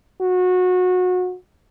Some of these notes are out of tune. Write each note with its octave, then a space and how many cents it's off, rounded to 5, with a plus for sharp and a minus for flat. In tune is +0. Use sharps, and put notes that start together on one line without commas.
F#4 -25